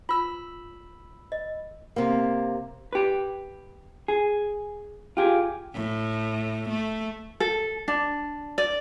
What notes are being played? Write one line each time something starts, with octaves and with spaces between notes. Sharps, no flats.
F4 B5 E6
D#5
C3 A#3
G4 B4
G#4
F4 G4 G#4
A2
A3
A4
D4
D5